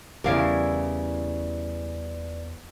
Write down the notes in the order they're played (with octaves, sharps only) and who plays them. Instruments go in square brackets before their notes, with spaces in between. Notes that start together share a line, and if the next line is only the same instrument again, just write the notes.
[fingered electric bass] E2 [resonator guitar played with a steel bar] C#3 E4 A#4 [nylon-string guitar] G3 F5 [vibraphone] B4 D5